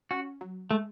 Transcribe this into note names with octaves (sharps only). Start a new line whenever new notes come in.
C#4 F#4
F#3
G#3 A3